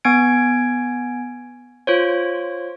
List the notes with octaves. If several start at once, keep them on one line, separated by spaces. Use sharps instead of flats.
B3 G#5 G#6 D7
F4 C5 C#5